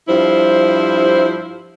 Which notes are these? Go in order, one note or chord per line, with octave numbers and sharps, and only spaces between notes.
G2 F3 E4 C5